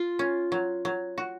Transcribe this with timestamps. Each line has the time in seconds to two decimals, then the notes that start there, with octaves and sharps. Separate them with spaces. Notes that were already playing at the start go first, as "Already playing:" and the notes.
Already playing: F4
0.19 C#4
0.52 F#3
0.85 F#3
1.18 F#4